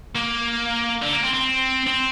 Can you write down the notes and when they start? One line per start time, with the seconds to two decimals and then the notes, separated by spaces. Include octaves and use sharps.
0.16 A#3
1.02 D3
1.13 A#3
1.23 C4
1.34 C4
1.87 C4